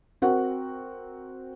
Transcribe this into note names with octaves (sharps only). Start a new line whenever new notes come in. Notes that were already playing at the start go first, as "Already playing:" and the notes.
C4 F#4 A#4 F#5